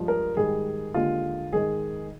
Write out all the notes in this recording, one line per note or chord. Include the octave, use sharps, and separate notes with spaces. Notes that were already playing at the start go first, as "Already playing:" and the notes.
Already playing: G2 F3 G#3
A#4
G#2 D#3 G3 G#4
D#2 D3 G#3 F4
G#2 D#3 G#3 G#4